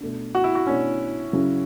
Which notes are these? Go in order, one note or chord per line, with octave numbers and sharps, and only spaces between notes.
B2 A3 D4
F#4
E4
F#4
B2 A3 C#4 D4
C#3 F#3 C#4 E4